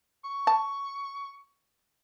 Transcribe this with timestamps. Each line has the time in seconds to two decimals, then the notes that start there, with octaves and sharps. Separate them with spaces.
0.24 C#6
0.47 A5